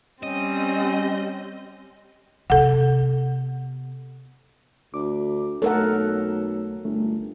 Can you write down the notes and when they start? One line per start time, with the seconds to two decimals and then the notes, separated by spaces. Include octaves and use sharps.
0.23 G3 C4 C#4 D#5
2.50 C3 B3 A4 F#5
4.94 D2 D6
5.62 B1 A3 A4 A#4 C#5 F#5
6.85 G1 A3